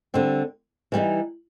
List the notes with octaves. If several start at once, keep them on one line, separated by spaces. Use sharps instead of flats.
D3 G3 C4
E3 G3 B3 D#4